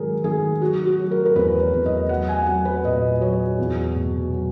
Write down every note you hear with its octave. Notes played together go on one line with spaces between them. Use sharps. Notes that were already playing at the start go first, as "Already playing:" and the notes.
Already playing: G#2 D#3 F#3 G#4 A#4
D#3 G#4
F#3 F#4
F#4
F#3
A#4
A#4
E2 B4
C#5
E2
D#5
F#3 F#5
G#5
F#3 F#5
B4
A#2 D#5
F#3 C#5
E2
B2
F#3